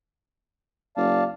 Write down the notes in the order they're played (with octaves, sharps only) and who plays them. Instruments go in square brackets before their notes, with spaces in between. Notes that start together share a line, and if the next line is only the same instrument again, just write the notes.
[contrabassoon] F#1 [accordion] D5 F5 A5